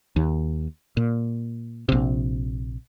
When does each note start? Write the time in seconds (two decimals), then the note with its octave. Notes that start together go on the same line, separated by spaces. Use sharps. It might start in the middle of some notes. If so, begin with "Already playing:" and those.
0.16 D#2
0.97 A#2
1.89 A#1 C3